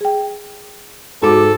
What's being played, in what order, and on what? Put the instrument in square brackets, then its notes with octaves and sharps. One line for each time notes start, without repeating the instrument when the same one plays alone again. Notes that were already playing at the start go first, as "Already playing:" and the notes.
[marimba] G#4 G5
[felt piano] G#2 D6 [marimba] F#4 [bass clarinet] A4